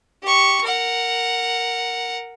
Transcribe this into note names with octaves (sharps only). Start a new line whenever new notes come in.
G4 C#6
A#4 F#5